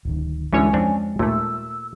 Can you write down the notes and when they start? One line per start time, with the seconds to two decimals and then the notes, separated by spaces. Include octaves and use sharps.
0.05 D1 D#3
0.53 D2 D3 E3 G#3 C#4 C#5 G#5
0.73 F2 C4 D4
1.19 D#2 A#2 A3 E6